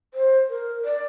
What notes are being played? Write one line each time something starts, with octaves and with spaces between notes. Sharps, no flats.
C5
A#4
D5